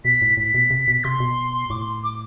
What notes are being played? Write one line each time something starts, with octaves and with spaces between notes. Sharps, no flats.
B2 B6
A2
A2 B6
B2
C3
B2
C3 C6
B2
A2 D6
C6
D6